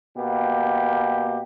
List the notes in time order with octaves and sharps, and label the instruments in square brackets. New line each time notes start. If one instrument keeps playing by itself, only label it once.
[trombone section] B2 A#3 G4